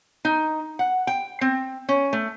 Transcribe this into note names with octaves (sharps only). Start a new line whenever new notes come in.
D#4
F#5
G5
C4
C#4
A3